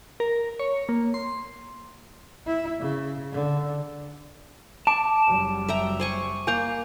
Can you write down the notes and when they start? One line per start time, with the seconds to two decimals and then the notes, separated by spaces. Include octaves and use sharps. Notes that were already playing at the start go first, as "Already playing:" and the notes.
0.20 A#4
0.59 C#5
0.89 A#3
1.14 C6
2.46 E4
2.80 C#3
3.32 D3
4.87 A5 D6 D7 E7
5.27 F#1 F#3 G3
5.68 E5 G5 A#5
6.00 C5 G#5 C#6
6.47 A#3 G#5 A#5 C6 G6